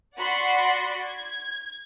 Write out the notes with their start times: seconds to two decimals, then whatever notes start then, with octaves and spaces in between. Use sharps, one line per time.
0.18 F#4 D5 F#5 B5 C6
1.04 G#6